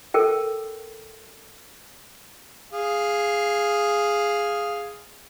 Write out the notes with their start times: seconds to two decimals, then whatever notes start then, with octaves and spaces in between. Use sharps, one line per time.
0.14 A4 A#4 G5
2.73 G#4 F5